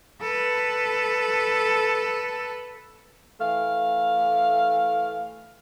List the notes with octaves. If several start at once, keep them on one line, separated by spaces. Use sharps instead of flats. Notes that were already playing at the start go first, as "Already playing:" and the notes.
A4 B4
E3 A3 F5